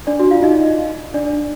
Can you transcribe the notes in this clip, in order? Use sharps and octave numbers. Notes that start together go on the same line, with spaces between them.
D4 D5
F#4
F4 F5
D#4 D#5
D4 D5